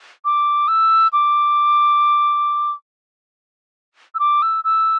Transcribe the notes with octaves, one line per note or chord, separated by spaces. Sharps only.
D6
E6
D6
E6
D6
E6
E6